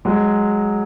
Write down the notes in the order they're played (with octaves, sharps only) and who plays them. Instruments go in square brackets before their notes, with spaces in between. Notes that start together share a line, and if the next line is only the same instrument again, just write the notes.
[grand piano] F#3 G#3